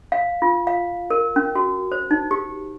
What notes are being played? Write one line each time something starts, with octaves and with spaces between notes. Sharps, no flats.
F5
F4
F5
A#4
C#4
F#4
C5
D#4
G4